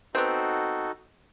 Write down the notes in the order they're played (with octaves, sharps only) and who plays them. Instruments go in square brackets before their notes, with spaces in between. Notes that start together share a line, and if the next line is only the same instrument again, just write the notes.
[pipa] B3 C4 [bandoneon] D#4 F#4 A4